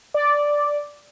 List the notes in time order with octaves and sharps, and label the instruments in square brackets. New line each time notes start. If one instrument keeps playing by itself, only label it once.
[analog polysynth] D5